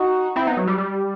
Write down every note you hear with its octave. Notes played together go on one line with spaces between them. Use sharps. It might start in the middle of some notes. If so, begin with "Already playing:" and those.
Already playing: D#4 F#4
C4 E4
B3 D#4
F#3
G3
G3